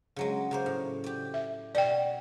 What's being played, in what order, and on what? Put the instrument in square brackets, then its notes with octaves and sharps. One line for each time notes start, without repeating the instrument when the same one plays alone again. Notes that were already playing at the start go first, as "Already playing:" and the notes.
[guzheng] C#3 F#3 G#3
C#3 A#3 C5
A2
G4 D5
[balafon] E5
[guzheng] B2 [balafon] D5 G5